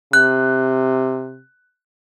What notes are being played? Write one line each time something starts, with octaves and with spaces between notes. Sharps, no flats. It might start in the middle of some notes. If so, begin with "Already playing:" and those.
C3 F#6